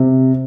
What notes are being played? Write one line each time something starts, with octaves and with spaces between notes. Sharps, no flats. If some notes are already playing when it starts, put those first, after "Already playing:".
Already playing: C3